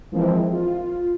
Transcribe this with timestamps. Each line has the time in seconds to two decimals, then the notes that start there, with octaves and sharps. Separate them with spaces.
0.12 E3 F3 G#3 A#3 C4 E4
0.53 F4